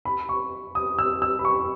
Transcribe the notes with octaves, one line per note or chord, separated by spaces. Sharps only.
B5
C#6
D#6
E6
E6
B5
C#6